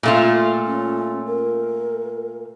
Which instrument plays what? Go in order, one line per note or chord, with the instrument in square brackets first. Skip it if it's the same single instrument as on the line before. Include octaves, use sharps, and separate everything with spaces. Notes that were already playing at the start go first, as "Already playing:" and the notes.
[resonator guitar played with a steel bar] A#2 A3 F4
[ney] C#4
A#4